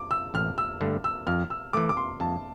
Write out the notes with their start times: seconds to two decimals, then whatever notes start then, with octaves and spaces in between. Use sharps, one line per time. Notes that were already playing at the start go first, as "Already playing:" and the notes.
Already playing: D6
0.11 E6
0.34 A1 F6
0.58 E6
0.81 G2 D3 A3
1.04 E6
1.27 F2 F6
1.50 E6
1.73 E3 A3 D6
1.89 D6
1.97 C6
2.20 F2 A5